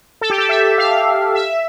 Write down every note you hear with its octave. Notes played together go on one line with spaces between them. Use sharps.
A4
G4
A4
E5
F5
E5